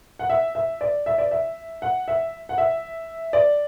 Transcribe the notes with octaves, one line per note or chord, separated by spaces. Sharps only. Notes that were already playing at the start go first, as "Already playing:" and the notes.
F#5
E5
E5
D5
E5
D5
E5
F#5
E5
F#5
E5
D5